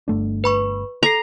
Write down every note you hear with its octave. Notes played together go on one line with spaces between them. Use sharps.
G1 A3 D4
B4 B5 C#6
A4 A#5 C7